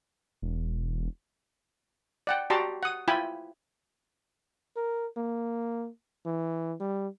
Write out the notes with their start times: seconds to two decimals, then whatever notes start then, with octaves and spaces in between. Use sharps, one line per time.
0.42 E1
2.27 D5 F#5 G5
2.50 F#4 G4 D5 A5 A#5 C6
2.83 F#5 D#6
3.08 E4 F4 G5 G#5 B5
4.76 A#4
5.17 A#3
6.26 E3
6.80 G3